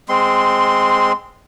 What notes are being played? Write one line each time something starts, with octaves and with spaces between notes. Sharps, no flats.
G#3 C4 C6